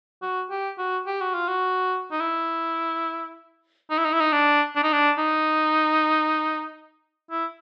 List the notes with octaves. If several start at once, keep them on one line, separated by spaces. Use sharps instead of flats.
F#4
G4
F#4
G4
F#4
F4
F#4
D#4
E4
D#4
E4
D#4
E4
D#4
D4
D4
D#4
D4
D#4
E4